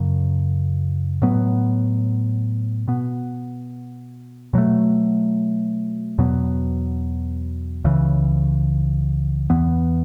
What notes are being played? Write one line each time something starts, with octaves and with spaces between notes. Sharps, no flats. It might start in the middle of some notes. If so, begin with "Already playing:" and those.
Already playing: F#2 C#3 F#3
A2 F#3 B3
B2 B3
B2 F#3 A3
E2 B2 F#3 B3
C#2 C#3 E3
E2 E3 B3